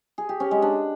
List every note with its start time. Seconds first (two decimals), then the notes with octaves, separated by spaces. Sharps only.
0.18 G#4
0.29 G4
0.40 C#4
0.51 G#3
0.62 D4